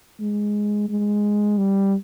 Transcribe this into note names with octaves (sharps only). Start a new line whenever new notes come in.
G#3
G#3
G3